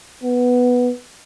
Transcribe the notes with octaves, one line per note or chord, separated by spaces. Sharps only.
B3